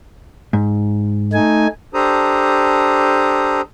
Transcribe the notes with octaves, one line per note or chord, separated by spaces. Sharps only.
G#2
A3 D#4 G#5
D4 G4 A4 C5 A#5 D#6